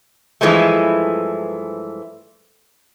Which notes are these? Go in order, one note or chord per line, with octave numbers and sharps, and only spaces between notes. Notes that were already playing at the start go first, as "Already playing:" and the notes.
G2 E3 F3 G#3 A3